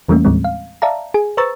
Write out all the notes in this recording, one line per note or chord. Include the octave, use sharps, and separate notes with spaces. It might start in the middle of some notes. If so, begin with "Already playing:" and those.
E2 E3 G3 A3 A#3 C#4
D#2 A2 E3 G3 G#3 C4
F5
D5 E5 F5 A5 A#5
G#4 G#5
B4 C5 A#5 C#6 E6 A6